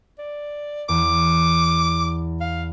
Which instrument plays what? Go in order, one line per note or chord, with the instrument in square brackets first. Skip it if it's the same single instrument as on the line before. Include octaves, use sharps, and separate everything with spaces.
[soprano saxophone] D5
[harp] E2 [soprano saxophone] D6
[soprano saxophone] F5